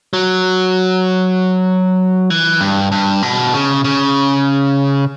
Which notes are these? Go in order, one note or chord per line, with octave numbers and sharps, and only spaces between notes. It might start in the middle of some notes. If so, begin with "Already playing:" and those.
F#3
E3
G2
G2
B2
C#3
C#3